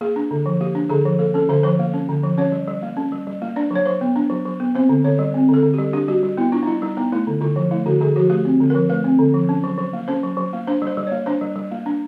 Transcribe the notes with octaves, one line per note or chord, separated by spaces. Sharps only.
A#3 G#4
D4
D3
F3
A#3 G4
D4
D3 G#4
F3
A#3 A4
C#4 A4
D3 C5
F3 C5
A#3
C#4
D3
F3
C#4 C#5
G3
G3
A#3
C#4
G3
G3
A#3
D4 D5
F#3 C#5
F#3 C5
B3
D4
F#3
F#3
B3
C4 C5
D3
D3 C#5
G3
C4
D3 A4
D3
G3 G4
D4 G4
G3 F#4
G3
B3 E4
D4 F4
D#4
G3 E4
G3 D#4
B3 D#4
A3 E4
D3
D3 F4
F3
A3 E4
D3 F#4
D3 G#4
F3 F#4
A3 G4
C4
D3
F3 A#4
A3 B4
C4
D3
F3
C#4
F#3
F#3
A#3
C#4 C5
F#3
F#3
A#3
D4 C5
G3
C5
G3
A#3 C#5
D4 C5
G3
G3
A#3
D4